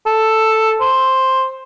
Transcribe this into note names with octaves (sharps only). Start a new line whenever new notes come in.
A4
C5